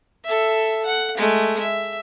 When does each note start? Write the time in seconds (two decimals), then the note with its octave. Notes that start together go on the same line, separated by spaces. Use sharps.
0.25 A4 E5
0.86 F#5
1.17 G#3 A3
1.60 E5